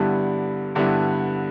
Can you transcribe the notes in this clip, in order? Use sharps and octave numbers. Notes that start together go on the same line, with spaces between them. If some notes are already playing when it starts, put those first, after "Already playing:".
Already playing: G2 D3 G3 B3 E4
G2 D3 G3 B3 E4